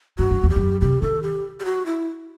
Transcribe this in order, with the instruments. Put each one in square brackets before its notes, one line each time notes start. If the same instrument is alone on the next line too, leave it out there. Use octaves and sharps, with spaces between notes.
[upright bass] G2 [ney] F#4
[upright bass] F#2
E2
[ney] G4
[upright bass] F#2
[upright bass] C3 [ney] G4
[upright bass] D#3 [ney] A4
[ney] G4
G4
F#4
E4